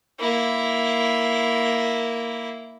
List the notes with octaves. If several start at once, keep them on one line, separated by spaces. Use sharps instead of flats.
A#3 E4